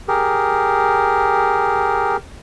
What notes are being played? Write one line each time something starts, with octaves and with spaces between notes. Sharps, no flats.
G4 G#4 A#4